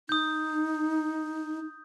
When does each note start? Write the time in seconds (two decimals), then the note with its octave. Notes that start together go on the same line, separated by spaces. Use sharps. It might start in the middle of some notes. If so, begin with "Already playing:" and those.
0.09 D#4 D#6 G6